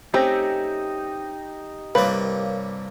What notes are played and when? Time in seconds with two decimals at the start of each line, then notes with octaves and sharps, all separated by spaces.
0.14 A3 C4 C#4 D#4 G4 E6 G6 A#6
1.95 C2 G2 A#3 A#4 B4 C#5 F5